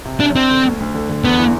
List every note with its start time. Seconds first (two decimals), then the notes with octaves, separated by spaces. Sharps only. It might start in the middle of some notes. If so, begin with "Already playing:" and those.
0.05 C3
0.20 C3 D4
0.35 C4 D4
0.50 D3
0.65 D2
0.80 D2
0.95 D3
1.09 D3
1.24 E2 B3
1.39 E3